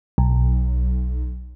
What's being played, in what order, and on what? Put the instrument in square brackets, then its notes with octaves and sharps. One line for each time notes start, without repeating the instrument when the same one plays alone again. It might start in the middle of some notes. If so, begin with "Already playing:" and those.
[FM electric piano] B1